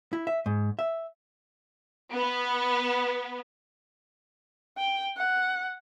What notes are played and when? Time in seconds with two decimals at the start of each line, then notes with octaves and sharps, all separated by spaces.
0.13 E4
0.27 E5
0.46 G#2
0.79 E5
2.14 B3
4.78 G5
5.17 F#5